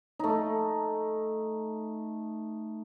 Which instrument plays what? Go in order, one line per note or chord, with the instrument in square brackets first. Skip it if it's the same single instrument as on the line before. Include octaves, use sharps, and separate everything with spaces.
[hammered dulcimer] A3 D#4